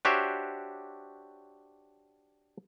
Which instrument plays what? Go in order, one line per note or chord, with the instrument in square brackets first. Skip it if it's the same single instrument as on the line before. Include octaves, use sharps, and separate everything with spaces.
[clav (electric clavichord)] D4 F#4 G4 C5 C#5 E5